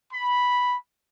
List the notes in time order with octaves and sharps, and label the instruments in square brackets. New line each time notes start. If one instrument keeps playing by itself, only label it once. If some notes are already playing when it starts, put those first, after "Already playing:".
[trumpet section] B5